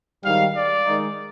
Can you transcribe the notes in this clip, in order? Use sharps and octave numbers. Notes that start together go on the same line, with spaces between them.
G#2 D#3 G3 F5
D5
D#3 G#3 D#4